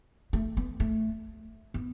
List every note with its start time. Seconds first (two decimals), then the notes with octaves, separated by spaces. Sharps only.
0.33 A3
0.57 B3
0.80 A3
1.74 B3